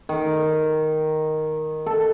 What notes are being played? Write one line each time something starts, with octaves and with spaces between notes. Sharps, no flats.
D#3
A4